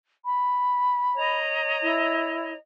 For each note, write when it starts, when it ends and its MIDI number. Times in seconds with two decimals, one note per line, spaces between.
0.25 1.38 83
1.16 2.57 73
1.16 2.57 75
1.16 2.57 82
1.82 2.52 64